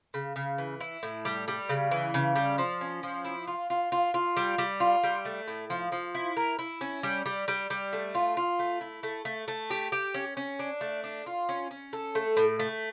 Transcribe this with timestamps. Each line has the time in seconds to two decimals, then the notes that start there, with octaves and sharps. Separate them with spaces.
0.14 C#3
0.36 C#3
0.58 E3
0.81 E4
1.03 A2
1.25 G3
1.48 G3
1.69 C#3
1.91 E3
2.14 C#3
2.36 G3
2.58 F3
2.81 C#4
3.03 F3
3.25 E4
3.48 F4
3.70 F4
3.92 F4
4.14 F4
4.37 G3
4.58 G3
4.80 F4
5.03 G3
5.25 A3
5.48 A2
5.70 F3
5.92 F3
6.15 E4
6.37 A#4
6.59 E4
6.81 C#4
7.03 G3
7.26 G3
7.48 G3
7.70 G3
7.93 A3
8.15 F4
8.37 F4
8.59 A3
8.81 E4
9.03 A3
9.25 A3
9.48 A3
9.70 G4
9.92 G4
10.14 C#4
10.37 C#4
10.59 D4
10.81 A3
11.04 D4
11.26 F4
11.49 C#4
11.71 C#4
11.93 A4
12.15 A3
12.37 A2
12.59 A3